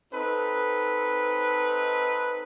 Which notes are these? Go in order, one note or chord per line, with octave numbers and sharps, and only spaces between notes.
C4 D#4 A4 B4